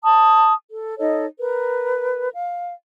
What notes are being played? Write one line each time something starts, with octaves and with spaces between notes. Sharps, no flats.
A5 D#6
A4
D#4 A4 C#5 D#5
A#4 B4
F5